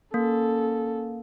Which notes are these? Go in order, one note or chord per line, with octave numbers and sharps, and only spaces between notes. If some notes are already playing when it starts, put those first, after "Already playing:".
A#3 C#4 A4